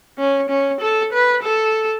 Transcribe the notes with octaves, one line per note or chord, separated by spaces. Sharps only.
C#4
C#4
A4
B4
A4